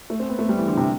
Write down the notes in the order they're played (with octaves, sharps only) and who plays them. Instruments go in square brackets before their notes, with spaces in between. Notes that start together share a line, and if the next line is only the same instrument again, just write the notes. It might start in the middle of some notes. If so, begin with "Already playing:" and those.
[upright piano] A3
C4
B3
A3
G3
E3
D3
C3